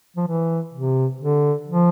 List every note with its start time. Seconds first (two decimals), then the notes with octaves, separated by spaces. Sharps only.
0.17 F3
0.28 E3
0.74 C3
1.21 D3
1.67 F3